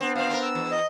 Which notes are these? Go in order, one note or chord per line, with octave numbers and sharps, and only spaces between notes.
B3 C4 D4
A#2 C4 F5
C4 C#4 A#4
E6
E2
D#5